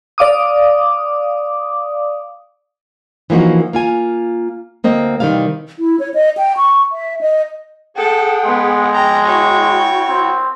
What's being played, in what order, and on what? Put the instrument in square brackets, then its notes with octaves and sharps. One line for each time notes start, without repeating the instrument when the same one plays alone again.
[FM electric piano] D5 F5 D6 D#6
[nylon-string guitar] E3 F3 A#3 D#4 F#4
A#3 F4 G#5
D2 A#3 C4 D#5
C3 D#3 E3 G3 A#3 F5
[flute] E4
C#5
D#5
G5
C#6
E5
D#5
[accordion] G#4 F#5 G5 [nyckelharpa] A4
[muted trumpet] G#3 [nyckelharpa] B3
[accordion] F2 [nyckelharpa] G5 A#5
[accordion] E4 F#4 [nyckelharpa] C#5 G5
[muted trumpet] C4